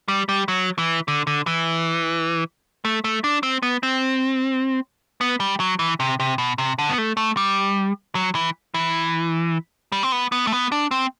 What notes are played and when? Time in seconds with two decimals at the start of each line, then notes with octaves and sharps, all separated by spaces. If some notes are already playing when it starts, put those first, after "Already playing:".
0.08 G3
0.29 G3
0.48 F#3
0.78 E3
1.08 D3
1.27 D3
1.47 E3
2.85 A3
3.04 A3
3.24 D4
3.43 C4
3.63 B3
3.83 C4
5.21 B3
5.40 G3
5.60 F#3
5.79 E3
6.00 C3
6.20 C3
6.38 B2
6.58 C3
6.79 D3
6.89 B3
6.98 A3
7.17 A3
7.37 G3
8.15 F#3
8.35 E3
8.74 E3
9.92 G3
10.03 C4
10.12 B3
10.32 B3
10.47 A3
10.52 B3
10.72 D4
10.91 C4